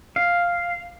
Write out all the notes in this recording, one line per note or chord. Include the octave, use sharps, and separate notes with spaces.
F5